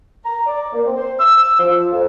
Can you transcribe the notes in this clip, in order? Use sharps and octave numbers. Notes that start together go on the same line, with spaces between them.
A#5
D5
A#3
C4
C5
E6
F3
F2